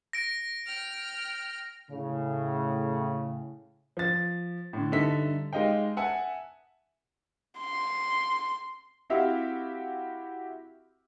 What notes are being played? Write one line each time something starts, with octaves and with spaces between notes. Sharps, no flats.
A#6 D7
G5 F6
A2 C#3
F3 A6
A2 D3
G2 D3 D#4 A4 E5 B6
G#3 D#4 G4 D#5 F5 G5
E5 F#5 G#5 A5
C6
C4 E4 F#4 G4 E5 F5